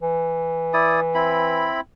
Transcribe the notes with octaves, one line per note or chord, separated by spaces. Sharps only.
E3
E4 D5 D#6
C4 E4 B5